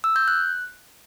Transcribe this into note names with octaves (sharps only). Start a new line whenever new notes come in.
E6
G6
F#6